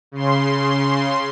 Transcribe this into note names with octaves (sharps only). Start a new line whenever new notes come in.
C#3 C6